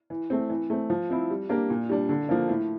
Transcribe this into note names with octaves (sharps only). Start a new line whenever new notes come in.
E3
A3 C4
E3
A3 C4
F3
C4 E4
G3
A#3 D4 G4 A#4
A#2
G3 D4
D3
F3 A#3
A2